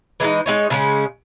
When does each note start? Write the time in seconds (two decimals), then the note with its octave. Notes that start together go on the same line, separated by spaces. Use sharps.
0.20 E3 G#3 A3 D#4
0.46 G#3 D#4 C#5
0.70 C#3 G#3 C#4